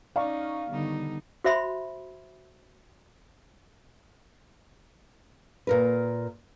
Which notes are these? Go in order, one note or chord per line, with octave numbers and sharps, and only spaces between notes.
C#4 D#4 D5 F5 A#5 C#6
D3 D#3 G3 B3 D#4
F#4 C5 E5 B5 C6
A#2 A#4 B4